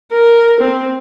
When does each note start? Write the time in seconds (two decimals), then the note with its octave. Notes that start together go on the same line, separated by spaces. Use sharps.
0.12 A#4
0.60 C4